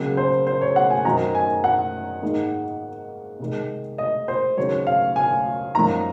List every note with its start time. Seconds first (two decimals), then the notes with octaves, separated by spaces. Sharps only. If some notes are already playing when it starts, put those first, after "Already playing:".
Already playing: C#2 C#3 F#3 A#3
0.17 C5
0.47 C5
0.61 C#5
0.76 F#5
0.90 G#5
1.05 F#2 D#3 F#3 C4 D#4 A#5
1.35 G#5
1.64 F#5
2.22 G#2 D#3 A#3 D#4
3.40 C3 D#3 G#3
3.98 D#5
4.28 C5
4.57 D#2 C#3 F#3 C4 C#5
4.87 F5
5.16 G#5
5.75 F#2 F3 A#3 D#4 A#5